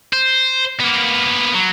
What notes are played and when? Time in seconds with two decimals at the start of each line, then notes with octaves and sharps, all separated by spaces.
0.13 C5
0.80 A#3 B3
1.54 F#3